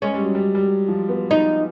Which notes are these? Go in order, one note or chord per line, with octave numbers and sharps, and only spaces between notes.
G#3 C#4
G3
F#3
G3
G3
F#3
F3
B3
D#4